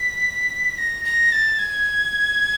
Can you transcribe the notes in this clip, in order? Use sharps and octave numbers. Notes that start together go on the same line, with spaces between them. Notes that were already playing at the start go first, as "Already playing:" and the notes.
Already playing: B6
A#6
A#6
A6
G#6